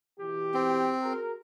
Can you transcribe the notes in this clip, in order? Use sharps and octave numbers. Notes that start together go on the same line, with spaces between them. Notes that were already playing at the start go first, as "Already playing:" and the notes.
B2 E3 G4
C4
F#4 G#4 A#4